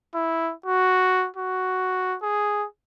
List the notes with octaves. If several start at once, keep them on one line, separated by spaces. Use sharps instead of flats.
E4
F#4
F#4
G#4